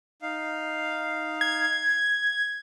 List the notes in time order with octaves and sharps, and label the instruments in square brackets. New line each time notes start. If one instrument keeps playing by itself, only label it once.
[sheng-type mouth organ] D#4 F5
[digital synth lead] G#6